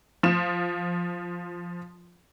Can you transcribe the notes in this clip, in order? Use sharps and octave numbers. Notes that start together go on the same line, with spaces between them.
F3 F4 E7